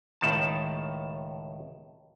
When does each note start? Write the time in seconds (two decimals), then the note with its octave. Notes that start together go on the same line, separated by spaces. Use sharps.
0.21 C#2 A2 D#3 A5